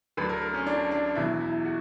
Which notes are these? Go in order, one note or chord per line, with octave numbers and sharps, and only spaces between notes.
D2 D3 F#3 B4
A#4
A#4
C#4
D4
D4
E2 B2 F#3 E4
E4
F#4